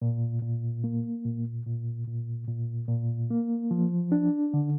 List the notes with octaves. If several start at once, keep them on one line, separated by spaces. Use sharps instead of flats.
A#2
A#2
A#3
A#2
A#2
A#2
A#2
A#2
A#3
F3
D4
D3